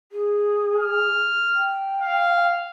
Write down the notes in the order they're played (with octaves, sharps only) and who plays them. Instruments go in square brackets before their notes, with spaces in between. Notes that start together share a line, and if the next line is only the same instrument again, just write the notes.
[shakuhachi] G#4
[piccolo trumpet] F6
[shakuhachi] G5
[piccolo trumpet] F5